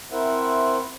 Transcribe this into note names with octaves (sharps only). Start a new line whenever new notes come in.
C4 E4 A#4 C5 E5 F#5